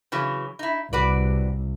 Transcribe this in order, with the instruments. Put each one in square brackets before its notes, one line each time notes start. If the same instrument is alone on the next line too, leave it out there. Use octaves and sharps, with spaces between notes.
[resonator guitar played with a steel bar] C#3 E3 F#3
D#4 E4
[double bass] C2 [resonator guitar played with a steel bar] F#4 B4 D5